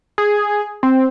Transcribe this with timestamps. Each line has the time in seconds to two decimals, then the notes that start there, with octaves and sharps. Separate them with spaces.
0.18 G#4
0.83 C4